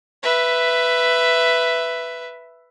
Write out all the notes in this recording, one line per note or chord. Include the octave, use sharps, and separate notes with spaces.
B4 E5